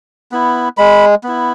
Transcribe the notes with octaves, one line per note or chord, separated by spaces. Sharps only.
B3 E4
G#3 B5
B3 E4